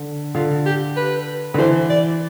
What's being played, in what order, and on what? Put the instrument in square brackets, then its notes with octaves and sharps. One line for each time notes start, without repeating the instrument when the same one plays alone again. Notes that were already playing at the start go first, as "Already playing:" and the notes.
Already playing: [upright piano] D3
[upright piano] D3 [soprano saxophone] F4
[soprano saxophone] G4
B4
[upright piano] D3 [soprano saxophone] B4
[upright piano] E3 [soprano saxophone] C5
[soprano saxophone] D5